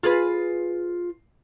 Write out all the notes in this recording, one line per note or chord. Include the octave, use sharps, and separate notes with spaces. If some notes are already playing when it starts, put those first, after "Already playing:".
F4 G#4 B4